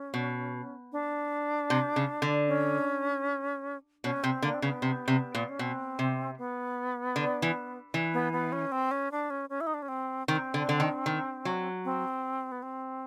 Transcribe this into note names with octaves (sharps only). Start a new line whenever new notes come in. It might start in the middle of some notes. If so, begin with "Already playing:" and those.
Already playing: C#4
B2
D4
C3
C#3
D3
C#4
B2 C#4
C3 C4
D3 A#3
C4
C#3 B3
C3
C3
A#2
C#4
B2 C4
C3
B3
D3
E3
E3
B3
B3
C#4
C4
C#4
D4
C#4
C#4
E4
D#4
D4
C#4
C4
D#3 C4
D3
D3
D#3
D#3
F#3
C4
B3
C4